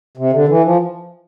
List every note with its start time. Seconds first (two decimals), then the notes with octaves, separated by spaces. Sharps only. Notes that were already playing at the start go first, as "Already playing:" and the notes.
0.17 C3
0.32 D3
0.49 E3
0.64 F3